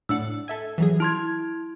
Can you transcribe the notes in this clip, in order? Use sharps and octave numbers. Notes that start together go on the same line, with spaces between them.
A2 D4 F#5 E6
A4 E5 G#5
E3 F#3 G#4
E4 C6 G#6